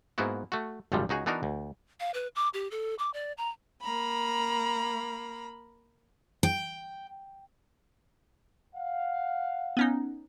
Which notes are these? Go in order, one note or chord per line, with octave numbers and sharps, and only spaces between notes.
G#2 A#3 B3 E4 F#4
A3 F#4
G#1 C#2 F#2 C3 F3 G3
C#2 D#4 F#4 G#4
E3 B3 D4 D#4 F#4 A#4
D2
F5
B4
D6
G4
A4
D6
D5
A#5
A#3 A#5 B5
G5
F5 F#5
B3 C#4 D#4